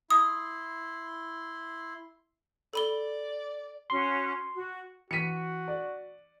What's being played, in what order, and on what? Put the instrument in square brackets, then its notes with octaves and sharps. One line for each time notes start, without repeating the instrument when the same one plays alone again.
[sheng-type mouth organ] E4 C6 [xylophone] D#6
[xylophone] A4 B5 G7 [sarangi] D5
[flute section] C#4 F#4 [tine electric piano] C6
[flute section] F#4
[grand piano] E3 D#7 [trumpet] F#4 [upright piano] B6 C#7
[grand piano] D5